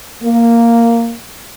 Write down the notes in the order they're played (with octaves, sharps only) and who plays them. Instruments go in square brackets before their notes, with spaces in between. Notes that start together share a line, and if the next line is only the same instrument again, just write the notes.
[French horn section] A#3